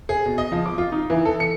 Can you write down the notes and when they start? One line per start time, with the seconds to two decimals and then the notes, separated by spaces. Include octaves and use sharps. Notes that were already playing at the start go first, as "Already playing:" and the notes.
0.09 G#4
0.26 B2
0.38 D#5
0.52 F3
0.66 D6
0.78 F4
0.92 D#4
1.10 E3
1.25 A4
1.40 C#7